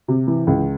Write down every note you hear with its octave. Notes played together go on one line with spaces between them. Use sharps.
C3
E3
C#2